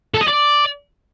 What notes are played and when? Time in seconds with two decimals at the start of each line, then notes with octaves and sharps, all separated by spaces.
0.14 A4
0.21 D#5
0.28 D5